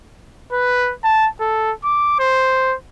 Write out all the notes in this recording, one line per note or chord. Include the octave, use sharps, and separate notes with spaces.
B4
A5
A4
D6
C5